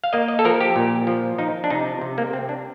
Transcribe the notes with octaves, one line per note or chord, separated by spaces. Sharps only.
F5
A#3 D#5
D#5
A4
F3 A#4
G4
A#2
F3
F3 D#4
D4
C3 D#4
C3
A#3
C3 C4
D4